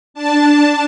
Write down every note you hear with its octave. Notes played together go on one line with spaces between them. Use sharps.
D4 A5